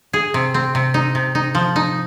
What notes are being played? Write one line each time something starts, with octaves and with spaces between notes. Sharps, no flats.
G#4
C3
C4
C3
D#4
C3
D#4
F3
D#4